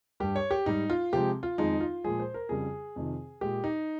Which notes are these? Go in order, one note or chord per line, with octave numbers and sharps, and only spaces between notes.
G2 G3 G4
C#5
G4
G#2 G3 D#4
F4
C3 F3 G#3 G4
F4
F2 D#3 G#3 D#4
F4
A#2 F3 G#3 G#4
C5
A#4
F2 C#3 G3 G#4
F2 C3 D#3
A#2 G#3 G4
D#4